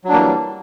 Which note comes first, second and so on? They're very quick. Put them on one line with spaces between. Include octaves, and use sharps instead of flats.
F#3 D4 A#3 E3 G3